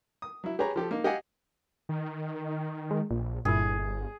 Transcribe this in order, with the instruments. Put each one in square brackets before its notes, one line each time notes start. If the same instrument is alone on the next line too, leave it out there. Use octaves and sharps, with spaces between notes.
[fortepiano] D#6
F#3 E4
G4 G#4 B4 C#5 A#5
F3 G4 A4
A#3 D#4
G4 D#5 F5 F#5 G#5
[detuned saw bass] D#3
[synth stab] G#3
[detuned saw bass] A#1 [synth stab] A#2
[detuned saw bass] G1 [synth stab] G2 A#2 E4 [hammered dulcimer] G#4